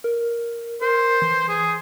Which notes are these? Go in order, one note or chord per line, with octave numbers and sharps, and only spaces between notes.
A#4
A#4 C5
E3
G#4